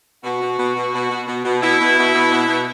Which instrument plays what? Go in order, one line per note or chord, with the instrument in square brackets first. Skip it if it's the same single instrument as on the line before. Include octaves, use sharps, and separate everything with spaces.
[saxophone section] B2 F#4
B2
B2
B2
B2
B2
B2
B2
B2 E4
B2
B2
B2
B2
B2